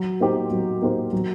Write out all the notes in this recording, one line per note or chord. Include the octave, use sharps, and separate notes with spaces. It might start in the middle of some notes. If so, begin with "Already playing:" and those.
Already playing: F#3
A#3 D#4 G4 C5
F#3
A#3 D#4 G4 C5
F#3